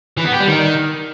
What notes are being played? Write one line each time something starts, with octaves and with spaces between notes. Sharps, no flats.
E3
B3
G4
G3
D#3